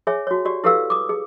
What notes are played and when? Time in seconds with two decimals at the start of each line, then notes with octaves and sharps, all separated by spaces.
0.07 G#4 C#5 E5 G#5
0.27 F#4 C#5
0.45 F#4 G4 D5
0.64 E4 G4 A4 B4 F5 E6
0.90 D6 D#6
1.09 G#4